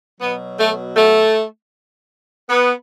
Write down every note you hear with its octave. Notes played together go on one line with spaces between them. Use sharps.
B2 F#3 B3
A3
A3
B3